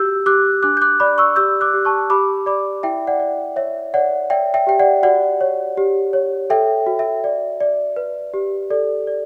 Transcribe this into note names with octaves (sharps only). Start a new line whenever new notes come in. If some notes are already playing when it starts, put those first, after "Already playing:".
Already playing: F#4 G4 E6 G6
G4 D6 F#6
D4 D6 F#6
G6
D6 F#6
D5 B5 D6
C#6 E6
G4 E6 G6
D6 F#6
G4
A5 C#6
G4 B5 D6
D5 B5 D6
E4 E5 G5
D5 F#5
D5
C#5 E5
C#5 D5 F#5
D5 E5 G5
E5 G5
G4 G5
D5 F#5
F#4 D5 F#5
C#5
G4
C#5
A4 E5 G5
F#4
E5
D5
D5
B4
G4
A4 D5
D5